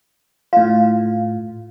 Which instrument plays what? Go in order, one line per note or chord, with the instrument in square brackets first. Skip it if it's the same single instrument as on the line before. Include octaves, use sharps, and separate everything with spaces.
[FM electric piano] A2 F4 [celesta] F5